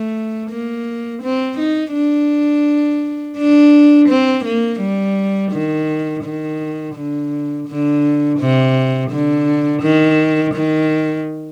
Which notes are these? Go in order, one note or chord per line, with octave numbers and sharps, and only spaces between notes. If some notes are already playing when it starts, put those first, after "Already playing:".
Already playing: A3
A#3
C4
D#4
D4
D4
C4
A#3
G3
D#3
D#3
D3
D3
C3
D3
D#3
D#3